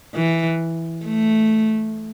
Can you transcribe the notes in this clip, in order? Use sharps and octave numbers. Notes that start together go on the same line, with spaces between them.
E3
A3